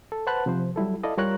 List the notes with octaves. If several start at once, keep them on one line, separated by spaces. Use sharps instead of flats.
A4
B4 C5 F#5 A5 B5 F#6
C3 F3 C5
F#3 G3 E4 A4
E4 A4 D5 D#5 F5
G3 F4 A#4 C#5 A#5 F#6